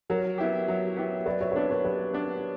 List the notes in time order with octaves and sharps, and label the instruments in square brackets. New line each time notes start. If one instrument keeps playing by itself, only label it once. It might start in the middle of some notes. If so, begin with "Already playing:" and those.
[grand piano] F#3 [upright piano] A#4 C#5
[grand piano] B3 E4 G4
F#3
B3 E4 G4
[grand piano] F#3 [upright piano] B4 D5
[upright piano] C#5 E5
C#5
[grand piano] B3 D4 [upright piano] B4 D5
[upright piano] A#4 C#5
[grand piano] F#3 [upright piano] G4 B4
[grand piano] B3 D4